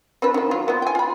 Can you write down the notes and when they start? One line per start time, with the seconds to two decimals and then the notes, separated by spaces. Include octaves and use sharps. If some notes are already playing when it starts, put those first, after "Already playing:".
0.22 C4 D4 B4
0.34 D#3 F3
0.51 F#3 F4
0.68 B3 C4 F4
0.82 G5 G#5
0.95 F4 B5